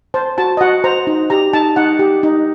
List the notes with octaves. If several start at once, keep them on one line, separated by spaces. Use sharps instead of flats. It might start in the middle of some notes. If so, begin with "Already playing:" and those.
C5 A5
F#4 A5
D#5
F#4 F#5
C5 A#5
D#4
G4 A#5
D#4 A5
D#4 F#5
G4
D#4